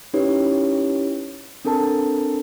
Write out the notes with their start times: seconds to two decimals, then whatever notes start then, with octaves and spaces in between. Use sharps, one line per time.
0.14 C#4 D#4 E4 G4 B4 C#5
1.65 C4 D4 A4 A#4 A5